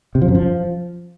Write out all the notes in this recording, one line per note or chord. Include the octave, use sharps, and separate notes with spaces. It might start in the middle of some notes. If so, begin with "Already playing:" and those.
C3
F3
F#2
F3